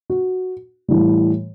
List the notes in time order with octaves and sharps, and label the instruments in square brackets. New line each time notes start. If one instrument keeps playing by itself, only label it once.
[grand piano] F#4
A2 E3 G3